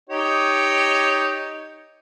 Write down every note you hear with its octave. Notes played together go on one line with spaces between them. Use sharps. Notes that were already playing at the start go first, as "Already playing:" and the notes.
D#4 G4 C#5